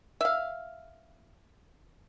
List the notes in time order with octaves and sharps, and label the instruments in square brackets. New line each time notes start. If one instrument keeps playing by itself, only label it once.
[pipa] E5 F5